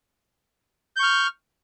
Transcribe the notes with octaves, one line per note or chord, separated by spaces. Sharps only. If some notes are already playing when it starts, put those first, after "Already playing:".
C#6 F6 G6